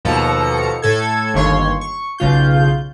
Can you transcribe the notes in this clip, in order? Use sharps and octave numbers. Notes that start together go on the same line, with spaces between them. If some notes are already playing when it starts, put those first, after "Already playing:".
D#2 B2 F3 A4 A#5 C#7
A2 A4 G#6
G1 D#2 C#5 C6
C#6
B1 C#3 F4 G6